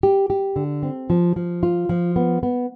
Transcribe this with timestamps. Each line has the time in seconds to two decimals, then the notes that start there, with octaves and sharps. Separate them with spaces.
0.03 G4
0.30 G4
0.56 D3
0.83 C4
1.10 F3
1.36 F3
1.63 F4
1.89 F3
2.16 B3
2.43 B3